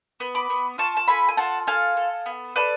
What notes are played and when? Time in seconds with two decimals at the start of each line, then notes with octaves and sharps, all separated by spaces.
0.20 B3
0.35 B5 D6
0.50 B3
0.78 F4 A5 C#6
0.97 A5
1.08 A4 G#5 B5
1.29 G#5
1.37 F4 F#5 A5
1.67 A4 F5 G#5
1.97 A4
2.26 B3
2.56 A4 B4 D5